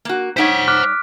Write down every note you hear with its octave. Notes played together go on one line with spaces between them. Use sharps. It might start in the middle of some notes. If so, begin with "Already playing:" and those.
A#3 F#4
G3 D#4 C5 C#5 F#5 B6 D7
D6 F6 F#6